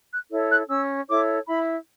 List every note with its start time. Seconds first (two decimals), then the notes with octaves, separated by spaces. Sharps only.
0.11 F#6
0.31 E4 A4 C#5
0.50 F#6
0.69 C#4 E6
1.08 E4 A4 C#5 D6
1.46 E4 B5